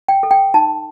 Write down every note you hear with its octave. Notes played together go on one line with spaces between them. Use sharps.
G5
A4
G5
D#4 A5